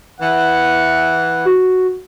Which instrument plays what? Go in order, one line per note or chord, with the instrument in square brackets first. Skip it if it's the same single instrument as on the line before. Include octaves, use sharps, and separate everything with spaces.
[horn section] E3 F#5
[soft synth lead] F#4